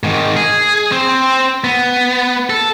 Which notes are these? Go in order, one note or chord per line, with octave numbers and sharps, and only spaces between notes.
G#2 D#3
G#4
C4 C5
B3
A4